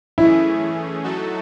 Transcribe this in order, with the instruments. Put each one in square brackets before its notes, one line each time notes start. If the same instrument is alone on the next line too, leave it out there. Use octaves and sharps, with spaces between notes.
[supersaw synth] E3 A3 C#4 G#4 [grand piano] E4
[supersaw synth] F#3 A3 D#4 F#4 A4